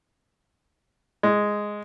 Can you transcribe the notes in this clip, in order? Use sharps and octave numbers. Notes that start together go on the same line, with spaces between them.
G#3